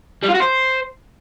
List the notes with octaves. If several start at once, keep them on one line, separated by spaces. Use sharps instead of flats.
G3
F4
F#4
C5